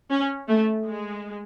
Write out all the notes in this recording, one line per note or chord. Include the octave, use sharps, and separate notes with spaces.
C#4
A3
G#3